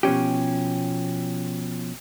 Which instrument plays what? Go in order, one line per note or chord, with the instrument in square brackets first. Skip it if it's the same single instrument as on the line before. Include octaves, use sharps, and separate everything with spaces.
[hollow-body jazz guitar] B2 F3 C#4 G4